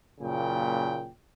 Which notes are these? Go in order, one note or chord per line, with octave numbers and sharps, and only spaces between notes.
F#1 A#2 C#3 G5